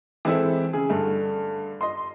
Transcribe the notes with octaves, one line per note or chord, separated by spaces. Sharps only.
E3 G#3 C4 E4 A4
C#3 G#4
G2 D3 A3
D#5 C6